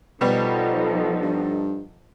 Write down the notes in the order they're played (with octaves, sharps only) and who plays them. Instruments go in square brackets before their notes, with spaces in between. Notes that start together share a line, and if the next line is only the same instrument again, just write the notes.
[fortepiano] B2 G3 B3 [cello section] F3 D#4 A4
[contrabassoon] G2